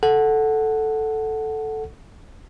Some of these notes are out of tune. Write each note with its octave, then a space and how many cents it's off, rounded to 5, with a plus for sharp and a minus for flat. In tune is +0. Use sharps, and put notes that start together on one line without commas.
A4 -5 F#5 +0